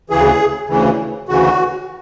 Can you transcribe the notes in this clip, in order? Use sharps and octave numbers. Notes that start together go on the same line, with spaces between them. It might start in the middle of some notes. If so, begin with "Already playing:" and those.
D2 C#3 E3 G#4
D2 C#3 E3
D2 C#3 E3 F#4